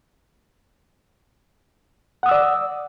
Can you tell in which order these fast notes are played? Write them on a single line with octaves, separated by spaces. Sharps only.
F#5 D#6 E6 D5